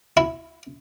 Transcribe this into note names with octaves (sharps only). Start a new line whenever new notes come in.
E4